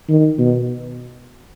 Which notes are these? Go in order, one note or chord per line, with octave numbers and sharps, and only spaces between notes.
D#3
B2